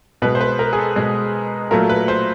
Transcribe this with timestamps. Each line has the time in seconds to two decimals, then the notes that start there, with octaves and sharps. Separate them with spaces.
0.22 B2 G#3 B4
0.35 C5
0.41 B4
0.59 A#4
0.73 G#4
0.78 A4
0.96 B2 G#3
1.71 A#2 F#3 A3 A#4
1.89 B4
2.08 C5